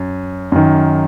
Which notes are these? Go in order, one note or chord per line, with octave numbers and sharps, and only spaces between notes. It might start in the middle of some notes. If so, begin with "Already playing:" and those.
Already playing: F#2
F#2 D#3